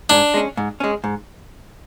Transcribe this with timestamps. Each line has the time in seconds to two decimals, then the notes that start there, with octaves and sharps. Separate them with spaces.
0.10 G#2 D4
0.34 G#3 C#4
0.57 G#2
0.80 G#3 C#4
1.04 G#2